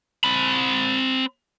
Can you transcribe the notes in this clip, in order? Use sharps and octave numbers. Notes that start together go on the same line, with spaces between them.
C4 B5